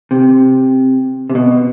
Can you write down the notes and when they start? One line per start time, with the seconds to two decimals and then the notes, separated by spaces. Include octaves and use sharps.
0.11 C3
1.30 C3
1.35 B2